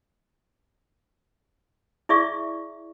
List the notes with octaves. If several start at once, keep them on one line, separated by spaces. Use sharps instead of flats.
E4 G#4 D5 E5 C#6